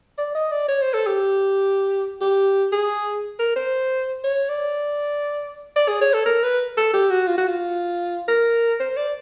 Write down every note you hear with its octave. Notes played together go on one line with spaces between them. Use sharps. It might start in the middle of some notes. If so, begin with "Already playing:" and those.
D5
D#5
D5
C#5
C5
A4
G4
G4
G#4
A#4
C5
C#5
D5
D5
G#4
C#5
A4
A#4
B4
A4
G4
F#4
F4
F#4
F4
A#4
C5
D5